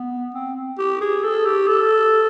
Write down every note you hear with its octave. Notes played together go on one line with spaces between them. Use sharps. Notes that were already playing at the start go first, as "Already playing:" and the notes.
Already playing: B3
C4
G4
G#4
A4
G4
A4